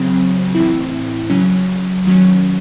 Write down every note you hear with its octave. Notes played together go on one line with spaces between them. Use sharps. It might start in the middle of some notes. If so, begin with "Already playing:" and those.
Already playing: C#3 F#3 C4
A2 E3 C4 E4
C#3 F#3 C#4
D#3 F#3 C#4